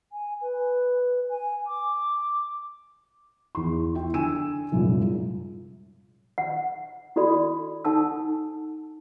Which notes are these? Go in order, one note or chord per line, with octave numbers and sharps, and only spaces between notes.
G#5
B4
G#5
D6
E2 C6
E4 G5
D3 G#5 E6 D#7 E7
C2 F#2 A#2 G#3
F#5
E4 F#4 A4 D5 B5
D#4 A4 F#5 G#5 A5 E6